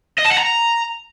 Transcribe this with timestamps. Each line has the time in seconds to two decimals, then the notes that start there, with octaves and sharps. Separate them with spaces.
0.18 D#5
0.25 A5
0.31 F#5
0.38 A#5